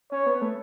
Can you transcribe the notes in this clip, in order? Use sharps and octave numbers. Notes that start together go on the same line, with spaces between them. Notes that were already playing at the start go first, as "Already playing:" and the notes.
C#4 C#5
B3
A3